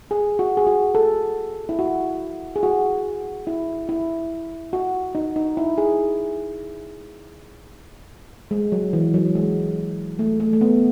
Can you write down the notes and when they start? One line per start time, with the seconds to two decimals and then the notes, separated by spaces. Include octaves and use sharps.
0.11 G#4
0.39 F#4
0.57 G#4
0.67 F#4
0.95 A4
1.69 E4
1.79 F#4
2.56 G#4
2.63 F#4
3.47 E4
3.89 E4
4.73 F#4
5.15 D#4
5.36 D#4
5.57 E4
5.78 G#4
8.51 G#3
8.72 F#3
8.93 E3
9.14 F#3
9.35 G#3
10.19 A3
10.40 A3
10.53 A3
10.61 B3